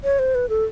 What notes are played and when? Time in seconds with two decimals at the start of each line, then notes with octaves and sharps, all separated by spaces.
0.04 C#5
0.19 C5
0.35 B4
0.49 A4